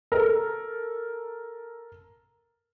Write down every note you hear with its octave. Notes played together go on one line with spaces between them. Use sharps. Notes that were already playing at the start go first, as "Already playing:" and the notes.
A4 A#4